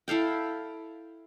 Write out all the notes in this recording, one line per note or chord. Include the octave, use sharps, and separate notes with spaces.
E4 A4 F5 G5